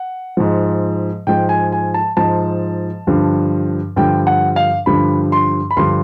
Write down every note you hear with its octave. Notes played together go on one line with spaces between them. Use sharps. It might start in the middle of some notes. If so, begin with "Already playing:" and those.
Already playing: F#5
G#2 F3
G#2 F3 G5
G#5
G#5
A5
G#2 F3 A5
G2 D3 F3
G2 D3 F3 G5
F#5
F5
G2 D3 F3 B5
C6
B5
G2 D3 F3 C6